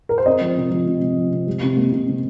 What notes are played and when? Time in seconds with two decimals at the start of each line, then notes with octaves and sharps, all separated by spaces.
0.09 A#4
0.18 C5
0.26 C4 D#5
0.41 F3
0.57 C3
0.71 F3
0.86 C3
1.02 C3
1.17 F3
1.32 C3
1.47 G3
1.63 C3
1.77 A#3
1.92 C3
2.08 C3